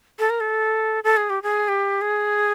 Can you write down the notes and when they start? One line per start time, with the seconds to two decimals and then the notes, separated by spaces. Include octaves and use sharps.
0.19 A4
0.30 A#4
0.40 A4
1.04 A4
1.17 G#4
1.30 G4
1.43 G#4
1.68 G4
2.01 G#4